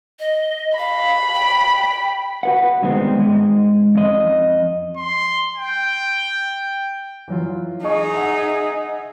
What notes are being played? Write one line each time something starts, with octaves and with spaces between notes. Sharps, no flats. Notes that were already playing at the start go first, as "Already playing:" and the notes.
D#5
F5 B5
G5
F#4 B4 F#5
G2 D#3 G#3 B3 C4
G#2 G#3
F2 D#5
C6
G5
E3 F#3 F4
D#4 G#4 D#5 C#6 D#6
E5 F#5